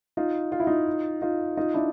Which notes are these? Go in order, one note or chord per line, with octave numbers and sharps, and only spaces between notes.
D#4 F4
F4
E4
D#4 F4
D#4 F4
D#4 F4
D4 E4